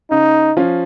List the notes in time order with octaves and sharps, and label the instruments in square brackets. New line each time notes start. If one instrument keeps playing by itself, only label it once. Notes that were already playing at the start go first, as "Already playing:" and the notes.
[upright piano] C#3 [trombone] D#4
[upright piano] F3 C#4 F4